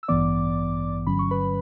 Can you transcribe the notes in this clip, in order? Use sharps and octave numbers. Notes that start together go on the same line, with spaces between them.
E6
A1 G2 E3 B3 D5 D6
G1 G2 D3 F#3 C#4 B5
C#6
B4 B5